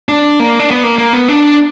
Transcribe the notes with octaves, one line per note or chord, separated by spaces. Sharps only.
D4
A#3
D4
B3
A#3
A#3
B3
D4